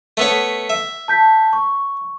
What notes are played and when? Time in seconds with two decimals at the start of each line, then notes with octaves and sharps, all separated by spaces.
0.17 A3 B3 C#5
0.69 E5
1.08 A5 G6 B6
1.53 C#6